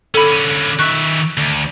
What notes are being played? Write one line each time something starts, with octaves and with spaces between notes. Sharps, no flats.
D3 C#4 A4 B5
D#7
D#3 E5 C#6 F#6
D2